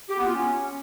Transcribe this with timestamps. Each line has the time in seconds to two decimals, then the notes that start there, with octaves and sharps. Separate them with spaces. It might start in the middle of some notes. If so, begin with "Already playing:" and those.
0.09 G4
0.18 B3
0.26 F4
0.35 C#4